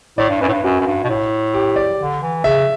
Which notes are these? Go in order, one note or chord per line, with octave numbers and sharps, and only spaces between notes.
A2 D5
G2
F#2 B4
A2
G2
F#2 F#4
F#2
G2
B2
A2
G4
D5
D3
E3
C#3 E5